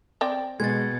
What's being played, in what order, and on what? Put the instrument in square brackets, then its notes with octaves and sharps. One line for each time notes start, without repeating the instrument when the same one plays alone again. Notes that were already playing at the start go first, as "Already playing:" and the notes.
[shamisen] C4 D5 G5
[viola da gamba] B2 [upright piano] G#3 [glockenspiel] G#6 A6